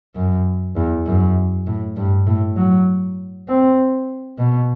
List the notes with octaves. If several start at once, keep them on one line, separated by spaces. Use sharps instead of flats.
F#2
E2
F#2
A2
G2
A2
F#3
C4
B2